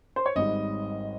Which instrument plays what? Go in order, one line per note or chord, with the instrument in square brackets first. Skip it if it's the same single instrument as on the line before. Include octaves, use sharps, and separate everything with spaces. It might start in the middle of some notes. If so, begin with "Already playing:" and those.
[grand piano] C5
C#5
G#1 G#2 G3 D#5